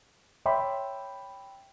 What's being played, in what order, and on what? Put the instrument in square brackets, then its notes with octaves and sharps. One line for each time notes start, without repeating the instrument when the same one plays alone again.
[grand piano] C#5 E5 G5 B5 C6 D6